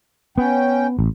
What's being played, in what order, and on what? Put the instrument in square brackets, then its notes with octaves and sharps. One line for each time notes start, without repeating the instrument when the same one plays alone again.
[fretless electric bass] B3 [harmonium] C#4 G5
[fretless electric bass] A1